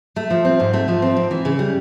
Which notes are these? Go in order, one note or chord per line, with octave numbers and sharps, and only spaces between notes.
A3
F3
C4
G#2
A3
F3
C4
G#2
E3
C#3
G3